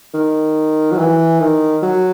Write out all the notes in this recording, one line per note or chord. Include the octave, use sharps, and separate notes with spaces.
D#3
F#3
E3
D#3
F#3